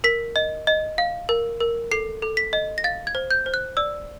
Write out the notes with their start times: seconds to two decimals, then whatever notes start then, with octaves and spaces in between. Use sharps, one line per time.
0.04 A#4 B6
0.36 D#5
0.67 D#5
0.98 F5
1.29 A#4
1.60 A#4
1.91 A4 C7
2.22 A4
2.37 B6
2.53 D#5
2.78 A#6
2.84 F5 A6
3.07 G#6
3.15 C5
3.31 G6
3.46 C5
3.54 F#6
3.77 D5 E6